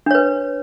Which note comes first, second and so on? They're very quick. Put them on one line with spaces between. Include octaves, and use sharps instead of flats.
D4 C#5 B4